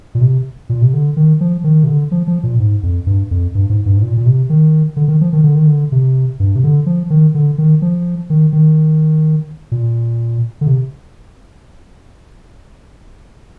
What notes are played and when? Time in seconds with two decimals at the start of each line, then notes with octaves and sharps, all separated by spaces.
0.15 A#2
0.21 C3
0.69 A#2
0.82 C3
0.94 D3
1.17 D#3
1.41 F3
1.64 D#3
1.84 C3
1.87 D3
2.12 F3
2.27 F3
2.43 A#2
2.60 G#2
2.83 F2
3.07 G2
3.31 F2
3.55 G2
3.70 G#2
3.86 G2
3.97 G#2
4.02 A#2
4.17 A#2
4.26 C3
4.50 D#3
4.96 D3
5.08 D#3
5.21 F3
5.33 D#3
5.44 D3
5.55 D#3
5.67 D3
5.92 C3
6.40 G2
6.56 C3
6.64 D3
6.86 F3
7.10 D#3
7.35 D3
7.58 D#3
7.82 F3
8.30 D#3
8.53 D#3
9.72 A#2
10.61 D3
10.66 C3